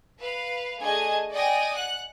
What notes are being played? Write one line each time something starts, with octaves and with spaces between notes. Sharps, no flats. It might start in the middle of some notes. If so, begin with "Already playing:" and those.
B4 F5
A3 D4 G#4 D#5 G#5 G#6
D5 D#5 G5 G#5 D#6 A#6
F#5 F#6